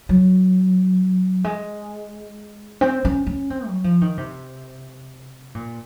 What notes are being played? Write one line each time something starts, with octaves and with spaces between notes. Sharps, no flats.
F#3
G#3
C4
C#4
C#4
C4
F#3
F3
D#3
C3
A#2